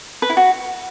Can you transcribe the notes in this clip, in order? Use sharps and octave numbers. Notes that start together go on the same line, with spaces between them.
B4
E4
F#4